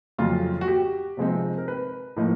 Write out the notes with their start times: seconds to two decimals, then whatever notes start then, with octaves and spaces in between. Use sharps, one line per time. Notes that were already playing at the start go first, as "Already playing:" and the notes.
0.18 F2 C#3 F#3 F4
0.61 F#4
0.68 G4
1.17 C3 F3 G#3 C4 D#4
1.58 A#4
1.68 B4
2.17 A2 F3 A#3 D#4